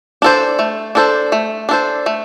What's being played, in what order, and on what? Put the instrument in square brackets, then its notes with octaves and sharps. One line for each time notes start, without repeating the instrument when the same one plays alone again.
[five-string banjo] D4 A4 C5
A3
D4 A4 C5
A3
D4 A4 C5
A3